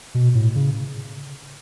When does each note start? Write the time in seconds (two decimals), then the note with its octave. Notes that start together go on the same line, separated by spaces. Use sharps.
0.15 B2
0.35 A2
0.55 C#3